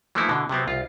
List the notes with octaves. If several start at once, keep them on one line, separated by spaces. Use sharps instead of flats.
E3 F3 A3 A#3 D#4 E4
B2 D3 E3
C3 F#3 B3 C4
C2 F4